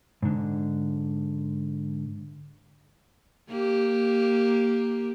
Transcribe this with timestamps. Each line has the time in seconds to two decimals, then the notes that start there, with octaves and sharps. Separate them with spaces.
0.23 G#2 D3
3.49 A#3 G4